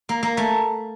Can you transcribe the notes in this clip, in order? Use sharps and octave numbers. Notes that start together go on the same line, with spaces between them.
A#3
A#3
A3